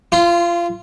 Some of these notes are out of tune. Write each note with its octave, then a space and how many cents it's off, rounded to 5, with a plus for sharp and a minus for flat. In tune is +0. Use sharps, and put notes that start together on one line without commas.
F4 -25 C6 +0